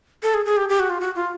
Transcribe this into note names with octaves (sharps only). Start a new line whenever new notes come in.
A4
G#4
G#4
G4
G4
F#4
F4
F#4
F4